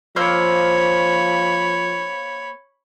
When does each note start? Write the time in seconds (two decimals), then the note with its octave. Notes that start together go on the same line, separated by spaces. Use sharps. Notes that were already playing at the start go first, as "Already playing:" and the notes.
0.16 F3 A#3 C5 C#5 B5 E6